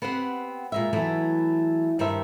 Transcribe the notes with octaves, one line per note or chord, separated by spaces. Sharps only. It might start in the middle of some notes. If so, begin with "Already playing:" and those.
B3 C4 G4 C5 F#5
A#2 G#3 E5
E3 F#3 A3 B3
G2 D#3 G4 C5 E5